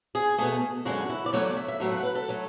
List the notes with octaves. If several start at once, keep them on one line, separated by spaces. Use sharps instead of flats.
G#4
B2 A3 G#4
F#2 D3 G#3 F#4
E4
D5
E2 D3 F#3 A3 C#5
D5
E5
E5
A2 F#3 A3 E5
F#5
B4
A4
F#3 A3